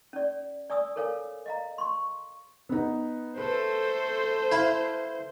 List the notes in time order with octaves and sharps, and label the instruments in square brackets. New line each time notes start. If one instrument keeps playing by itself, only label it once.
[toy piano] C#4 D5
D5 G#5 D#6 E6
A4 A#4 C#5 F5 G#5
D#5 F5 A#5
C6 C#6
[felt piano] B3 D#4
[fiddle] A3 A4 [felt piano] B4 [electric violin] C5
[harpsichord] E4 F5